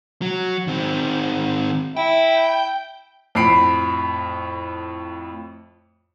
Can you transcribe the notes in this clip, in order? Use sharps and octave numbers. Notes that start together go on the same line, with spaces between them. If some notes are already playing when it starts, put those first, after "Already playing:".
F#3
D#3 C4
E4 G5
F2 A2 B5 C7 D7